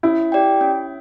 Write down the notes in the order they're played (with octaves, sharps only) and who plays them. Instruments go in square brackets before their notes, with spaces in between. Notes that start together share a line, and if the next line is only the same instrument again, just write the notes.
[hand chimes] C#4 [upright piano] E4
[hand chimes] G4 D5 G5
C#4